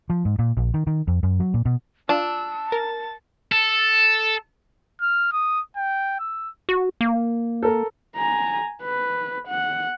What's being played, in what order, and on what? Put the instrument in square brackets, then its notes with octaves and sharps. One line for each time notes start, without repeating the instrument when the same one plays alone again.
[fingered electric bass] F3
G#2
A#2
A#1
D#3
D#3
F2
F#2
F#3
A#2
B2
[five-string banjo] D4 [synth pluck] F4 [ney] A5 [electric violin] E6
[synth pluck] A#4 [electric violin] A6
[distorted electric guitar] A4
[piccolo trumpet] F6
D#6
G5
E6
[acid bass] F#4
A#3
[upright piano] A4 A#4
[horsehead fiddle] G#5 A#5
B4
F#5